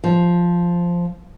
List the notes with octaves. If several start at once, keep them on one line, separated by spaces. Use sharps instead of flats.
F3